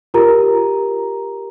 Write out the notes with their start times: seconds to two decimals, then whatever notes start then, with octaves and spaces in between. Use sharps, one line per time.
0.14 F4 G4 A#4 A#5